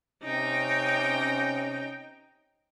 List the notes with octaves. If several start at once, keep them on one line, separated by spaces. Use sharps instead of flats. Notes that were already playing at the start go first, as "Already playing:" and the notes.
C3 C#4 D#4 G5